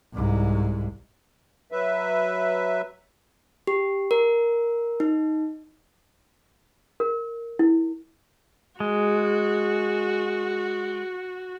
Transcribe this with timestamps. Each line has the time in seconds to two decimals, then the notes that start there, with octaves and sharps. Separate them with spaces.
0.14 C2 G#2
1.72 F#3 B4 E5
3.67 G4
4.11 A#4
5.00 D#4
7.00 A#4
7.59 E4
8.80 G#3 F#4